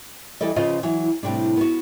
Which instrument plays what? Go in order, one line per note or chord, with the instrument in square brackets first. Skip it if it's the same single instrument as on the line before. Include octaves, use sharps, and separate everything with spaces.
[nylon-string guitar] E3 G3 A4 D#5
C#3 F3 F4 B4 D#5 F5
E3 F#3
A2 C3 G3 D4
B3 F#4